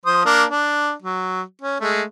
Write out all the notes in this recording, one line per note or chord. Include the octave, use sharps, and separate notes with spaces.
F3 C5 D#6
A#3 D4
D4
F#3
C#4
G#3 A3